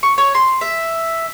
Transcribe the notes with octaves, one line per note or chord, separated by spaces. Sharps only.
C#6
C#5
C6
E5